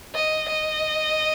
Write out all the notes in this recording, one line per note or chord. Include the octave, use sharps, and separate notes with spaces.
D#5
D#5